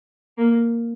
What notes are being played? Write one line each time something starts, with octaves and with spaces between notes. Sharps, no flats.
A#3